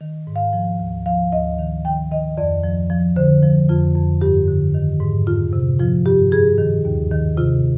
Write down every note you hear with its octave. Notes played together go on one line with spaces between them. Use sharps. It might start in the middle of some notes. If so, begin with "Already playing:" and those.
D#3
G#2
F5
F3
D2
F3 F5
D2 D#5
D#3
D#3 G5
D#3 D#5
F2 D5
F3
F3
D3 C5
F3
F2 F4
F2
G2 G4
D3
D#3
G#2
F2 F4
C3
F3 F4
G2 G4
G2 G#4
D#3
D#2
D#3
C3 F4